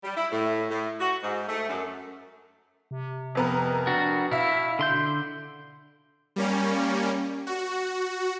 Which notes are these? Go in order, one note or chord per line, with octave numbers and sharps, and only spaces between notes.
G3
E4
A2
A2
F#4
G#2
A3
F#2
C3
F2 B3 A#4
D4 F#4
B2 E4 E5 F5
D3 C6 G6
G3 A#3 C#4
F#4